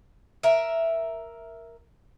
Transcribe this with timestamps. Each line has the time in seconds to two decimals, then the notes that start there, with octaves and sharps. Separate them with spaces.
0.43 A#4 E5